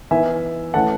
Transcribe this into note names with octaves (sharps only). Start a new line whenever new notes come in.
E3 B3 D#4 E5 G#5
E3 A3 C#4 F#5 A5